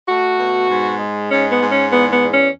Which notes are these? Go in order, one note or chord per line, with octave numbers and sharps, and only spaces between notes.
A3 F#4
B2
G#2
G#3
G#2 C#4
B3
G#2
C#4
E2 B3
B3
E2
C#4